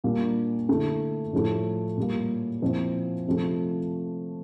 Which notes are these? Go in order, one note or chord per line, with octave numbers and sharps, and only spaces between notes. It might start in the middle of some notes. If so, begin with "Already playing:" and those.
A#2 G3 A#3 D4
D3 A3 E4
A2 F3 A3 E4
A#2 G3 A#3
A#2 F3 C4 E4
C3 F3 A3